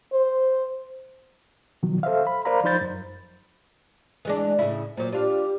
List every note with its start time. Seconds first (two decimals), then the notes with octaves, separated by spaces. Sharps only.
0.13 C5
1.83 B2 D#3 F3 F#3
2.03 A4 C5 E5 F5
2.27 B5
2.45 A#4 C5 D5 F5 A#5 B5
2.64 F3 D#4 C5 B5 G6 A6
2.81 F#2
4.25 E3 G#3 D4
4.59 A2 C#3 E4
4.97 A#2 F#3 C5
5.12 D4 F4 G4